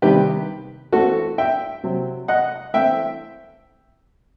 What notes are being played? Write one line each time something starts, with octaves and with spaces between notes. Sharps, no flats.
C3 D#3 G3 B3 G4 B4
E3 A3 C4 F#4 A4
E5 G5
C3 F#3 C4
D#5 F#5
E3 A3 C4 E5 G5